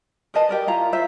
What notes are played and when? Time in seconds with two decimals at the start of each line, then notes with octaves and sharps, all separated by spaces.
0.34 A#4 B4 D#5 A5
0.49 G4 A#4 D5
0.67 E4 F4 A#5
0.92 F4 C5 E5